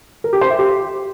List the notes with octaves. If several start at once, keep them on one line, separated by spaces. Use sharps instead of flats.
A#4
G4
C5
E5
G4